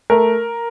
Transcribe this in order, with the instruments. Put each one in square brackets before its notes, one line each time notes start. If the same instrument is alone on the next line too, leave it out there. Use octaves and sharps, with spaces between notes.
[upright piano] A3 A#4